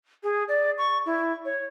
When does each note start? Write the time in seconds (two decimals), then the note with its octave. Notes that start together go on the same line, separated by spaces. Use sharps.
0.23 G#4
0.48 D5
0.77 C#6
1.05 E4
1.45 C#5